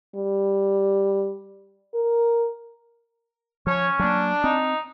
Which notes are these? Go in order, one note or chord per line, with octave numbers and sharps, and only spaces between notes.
G3
A#4
F3 C#4 C#5
F#3 A#3 D4
C4 D#4